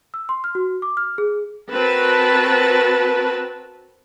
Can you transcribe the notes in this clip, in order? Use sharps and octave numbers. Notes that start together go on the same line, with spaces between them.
E6
C6
F6
F#4
D6
F6
G#4
C4 F#4 A#4 B4 A5